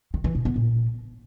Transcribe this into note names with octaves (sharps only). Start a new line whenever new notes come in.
D#3
E3
B2
B3
A#2